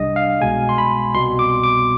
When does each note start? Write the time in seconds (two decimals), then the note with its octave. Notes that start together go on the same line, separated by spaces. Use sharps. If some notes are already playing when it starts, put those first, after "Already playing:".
Already playing: C2 C3 G3 D4 D#5
0.16 F5
0.41 C2 B2 G#3 G#5
0.69 C6
0.78 B5
1.14 C2 B2 G3 B3 C6
1.39 D6
1.64 D6